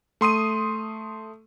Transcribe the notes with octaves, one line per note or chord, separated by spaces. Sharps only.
A3 C6 D#6 D#7